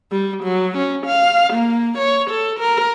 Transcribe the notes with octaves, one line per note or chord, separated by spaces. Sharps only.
G3
F#3
C#4
F5
A#3
C#5
A4
A#4